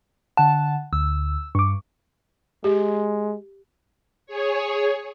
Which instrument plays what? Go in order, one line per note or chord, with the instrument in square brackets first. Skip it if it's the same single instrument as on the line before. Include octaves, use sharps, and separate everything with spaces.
[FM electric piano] D3 F#5 [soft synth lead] A5
[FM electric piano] D2 [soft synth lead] E6
[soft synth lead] G2 [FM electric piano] C#6 D6
[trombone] G#3 [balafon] G4
[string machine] G#4 C#5